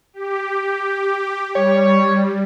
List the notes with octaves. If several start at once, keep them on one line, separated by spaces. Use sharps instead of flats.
G4
G3 C#5